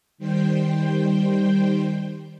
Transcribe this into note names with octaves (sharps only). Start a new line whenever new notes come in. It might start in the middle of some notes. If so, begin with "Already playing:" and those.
D#3 G3 C5 G5